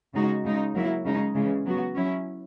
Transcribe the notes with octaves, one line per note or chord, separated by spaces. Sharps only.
C#3 G#3 D#4 F#4
C#3 G#3 D#4
F#3 A#3 E4
C#3 G#3 D#4
C#3 E3 G#3
F#3 B3 F#4
F#3 C#4 E4